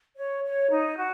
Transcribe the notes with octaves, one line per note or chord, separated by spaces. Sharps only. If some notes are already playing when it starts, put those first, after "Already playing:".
C#5
C#5
D#4
F#4